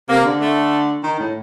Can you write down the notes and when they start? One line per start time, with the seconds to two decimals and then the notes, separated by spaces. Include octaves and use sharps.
0.09 C3 A#3
0.24 D3
0.41 A3
1.03 D#3
1.20 A2